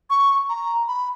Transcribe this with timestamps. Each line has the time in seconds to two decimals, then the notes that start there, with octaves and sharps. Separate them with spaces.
0.10 C#6
0.49 A#5
0.88 B5